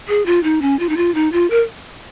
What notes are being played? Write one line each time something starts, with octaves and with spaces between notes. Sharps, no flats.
G#4
F4
D#4
C#4
F4
D#4
F4
D#4
F4
A#4